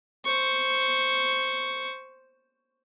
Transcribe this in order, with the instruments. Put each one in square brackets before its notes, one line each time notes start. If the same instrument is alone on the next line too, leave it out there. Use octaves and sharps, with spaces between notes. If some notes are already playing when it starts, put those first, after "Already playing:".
[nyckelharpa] C5 C#6